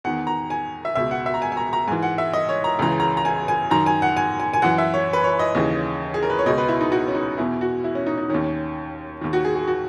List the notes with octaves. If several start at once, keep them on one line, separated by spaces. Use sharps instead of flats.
E2 D#3 F#5
A#5
G#5
E5
C#2 B2 E5
F#5
E5
A#5
G#5
G#5
A#5
A#5
G#2 E3 G#5
F#5
E5
D#5
C#5
A#5
C#2 C#3 E3 A#5
A#5
A#5
G#5
G#5
F#2 D#3 A#5
G#5
F#5
G#5
G#5
G#5
F#2 E3 F#5
E5
C#5
B4
C#5
D#5
D#2 C#3 E3
G#4
A#4
B4
C#5
C#2 B2 D#5
B4
E4
D#4
F#4
C#4
D#4
E2 B2 E4
F#4
E4
C#4
D#4
D#4
D#2 D#3 C#4
D#2 D#3
F#4
G#4
G#4
F#4